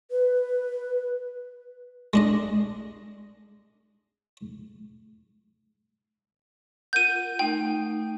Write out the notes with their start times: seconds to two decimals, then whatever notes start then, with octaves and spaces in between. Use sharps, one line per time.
0.11 B4
2.13 G#3 D4 D#5
6.93 F4 A#4 F#5 G6 D#7
7.39 A3 D#4 G5